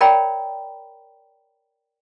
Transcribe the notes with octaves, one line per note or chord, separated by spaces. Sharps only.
A#4 C#5 D5 G5 A#5 B5